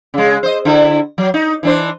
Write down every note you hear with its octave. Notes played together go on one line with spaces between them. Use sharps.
C#3 G#3
C5 D#5
D3 E4
F#3
D#4
E3 D4 C5